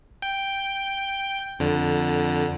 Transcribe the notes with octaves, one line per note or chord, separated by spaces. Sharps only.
G5
F2 D3